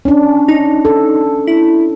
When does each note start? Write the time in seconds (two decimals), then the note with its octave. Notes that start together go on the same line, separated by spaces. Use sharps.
0.05 C#4 D4
0.48 D#4
0.85 A4
1.47 E4